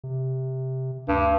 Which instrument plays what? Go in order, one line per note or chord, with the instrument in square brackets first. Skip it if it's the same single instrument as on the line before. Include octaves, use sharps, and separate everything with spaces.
[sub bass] C3
[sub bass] D2 [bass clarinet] G2